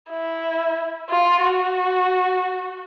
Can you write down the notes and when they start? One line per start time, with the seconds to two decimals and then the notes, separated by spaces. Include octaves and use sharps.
0.11 E4
1.10 F4
1.43 F#4